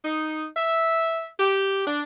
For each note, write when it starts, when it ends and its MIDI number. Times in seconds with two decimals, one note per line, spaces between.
0.04 0.46 63
0.57 1.27 76
1.40 1.86 67
1.86 2.02 62